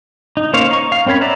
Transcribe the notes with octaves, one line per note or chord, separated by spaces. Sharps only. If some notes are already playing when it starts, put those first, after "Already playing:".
D#4
A#3 C#4 C5 C#5 F5
D#4 C#6
F5
C4 C#4 A#4 C#5 B5
D5 E5 F#5 A#5